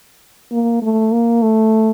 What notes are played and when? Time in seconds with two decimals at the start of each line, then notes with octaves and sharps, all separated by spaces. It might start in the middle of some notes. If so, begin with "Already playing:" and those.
0.52 A#3
0.82 A3
1.12 A#3
1.42 A3